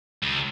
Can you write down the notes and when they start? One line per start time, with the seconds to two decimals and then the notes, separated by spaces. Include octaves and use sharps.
0.23 C#2